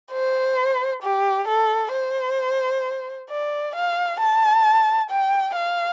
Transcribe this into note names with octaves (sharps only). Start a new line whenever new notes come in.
C5
G4
A4
C5
D5
F5
A5
G5
F5